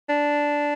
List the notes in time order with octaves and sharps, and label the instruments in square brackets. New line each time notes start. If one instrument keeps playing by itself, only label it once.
[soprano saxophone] D4